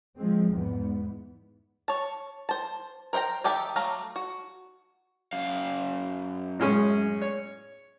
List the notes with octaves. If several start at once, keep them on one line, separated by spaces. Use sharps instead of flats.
F3 G#3 C4
E2 G#2 B3
C#5 A5
C5 A5
A#4 C5 E5 G5 A#5
D#3 G4 A4 E5 A5
F#3 A3 F5 A#5
F#4
F#2 F5
A2 G#3 C#4
C#5